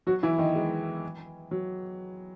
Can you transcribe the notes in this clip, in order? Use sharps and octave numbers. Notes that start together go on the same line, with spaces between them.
F#3 F#4
E3 E4
D#3 D#4
G#3
F#3